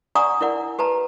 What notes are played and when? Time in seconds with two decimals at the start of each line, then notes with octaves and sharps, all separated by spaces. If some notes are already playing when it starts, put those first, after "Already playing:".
0.15 D5 F#5 G#5 A#5 C#6 D#6
0.41 E4 A#4 D5 F#5
0.79 G4 B4 A5 A#5